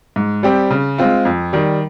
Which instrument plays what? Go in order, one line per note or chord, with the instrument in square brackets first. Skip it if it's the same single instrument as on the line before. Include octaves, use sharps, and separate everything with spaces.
[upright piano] G#2
G3 C4 G4
C#3
G#3 C4 F4
F2
D#3 G3